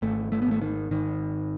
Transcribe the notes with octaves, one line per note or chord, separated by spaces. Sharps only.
G#1 A3
A3
B3
G#1 A3
D#3
G#1 D#3